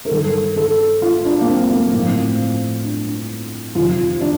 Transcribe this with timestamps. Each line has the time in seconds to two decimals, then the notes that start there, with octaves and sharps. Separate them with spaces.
0.05 A#4
0.11 G2 D#3 A4
0.56 A4
1.02 F4
1.25 D4
1.41 A#3
1.48 C4
1.71 A#3
1.93 A2 F3 C4
2.84 D4
3.75 F2 C3 D#3 F4
4.21 D4